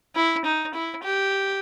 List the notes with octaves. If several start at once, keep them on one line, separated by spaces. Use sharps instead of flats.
E4
D#4
E4
G4